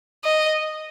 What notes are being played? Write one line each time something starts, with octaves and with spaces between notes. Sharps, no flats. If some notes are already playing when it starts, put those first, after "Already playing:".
D#5